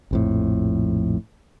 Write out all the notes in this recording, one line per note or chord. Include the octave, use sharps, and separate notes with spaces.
A#1 F2 A2